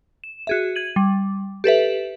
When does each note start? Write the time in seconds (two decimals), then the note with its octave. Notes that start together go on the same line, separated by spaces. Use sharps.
0.24 E7
0.47 F#4 G#4 E5
0.76 G#6 D#7 F#7
0.96 G3
1.64 G4 A4 B4 E5